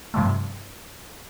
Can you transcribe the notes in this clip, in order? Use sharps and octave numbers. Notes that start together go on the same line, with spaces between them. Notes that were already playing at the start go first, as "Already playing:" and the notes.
G2 C3 F3 G3 A3